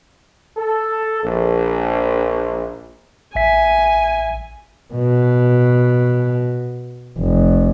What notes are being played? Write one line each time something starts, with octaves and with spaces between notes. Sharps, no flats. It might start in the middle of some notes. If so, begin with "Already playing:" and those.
A4
A#1
A1 E5 G#5 B6
B2
F1